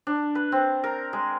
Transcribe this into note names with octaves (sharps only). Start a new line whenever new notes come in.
D4
B4
C4
A#4
G#3